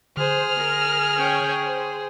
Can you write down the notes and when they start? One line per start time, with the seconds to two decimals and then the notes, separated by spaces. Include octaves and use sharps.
0.17 D3 G#4 C5 F6
0.59 A#4
1.17 C#4 C#5 G5
1.67 C5